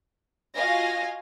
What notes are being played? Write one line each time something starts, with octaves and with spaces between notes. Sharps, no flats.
F4 F#4 D#5 F5 G#5 A#6